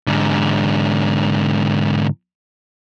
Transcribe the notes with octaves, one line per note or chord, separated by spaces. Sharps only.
G#2 D3